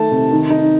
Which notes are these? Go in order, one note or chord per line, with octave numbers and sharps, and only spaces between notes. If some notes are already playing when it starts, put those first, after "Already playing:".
Already playing: D#3 A3 A5
C3
D#3
D#4